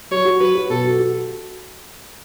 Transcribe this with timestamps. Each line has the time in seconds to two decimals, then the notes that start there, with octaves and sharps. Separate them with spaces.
0.11 F#3 C#5
0.25 F#4
0.40 F#3 B4
0.55 F#4
0.70 B2 A4
0.84 F#4
0.99 F#4